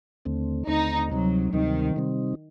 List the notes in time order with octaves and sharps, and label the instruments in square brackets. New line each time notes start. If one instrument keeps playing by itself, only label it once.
[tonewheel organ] D#2 D3 A3 C4
[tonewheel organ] D#2 D3 A3 C4 [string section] D#4
[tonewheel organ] D2 C3 G3 C4 D#4 [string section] F#3
[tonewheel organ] D2 C3 G3 C4 D#4 [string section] D#3
[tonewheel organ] C3 G3 C4 D#4